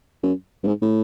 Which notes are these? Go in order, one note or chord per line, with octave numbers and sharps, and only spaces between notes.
F#2
G2
G#2
A2